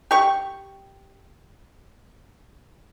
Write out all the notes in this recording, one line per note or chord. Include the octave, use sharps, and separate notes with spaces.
G4 C#6